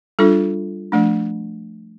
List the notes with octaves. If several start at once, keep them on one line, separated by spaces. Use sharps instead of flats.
G3 D4 F4 A4
F3 A3 D4